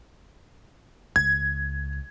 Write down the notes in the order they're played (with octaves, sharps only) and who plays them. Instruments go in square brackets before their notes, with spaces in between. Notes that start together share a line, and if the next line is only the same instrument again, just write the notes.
[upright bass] C#2 [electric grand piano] G#6